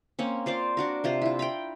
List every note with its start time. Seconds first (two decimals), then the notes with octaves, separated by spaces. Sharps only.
0.19 A#3 C4 C#4
0.46 F4 C5 D5 F5
0.77 D4 F#4 A#4
1.04 C3 F4 C5
1.22 E4 F4
1.39 G5 A#5 B5